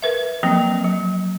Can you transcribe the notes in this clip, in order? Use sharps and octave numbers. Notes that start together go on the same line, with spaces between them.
A#4 B4 E5
F3 F#3 A#3 C4
F#3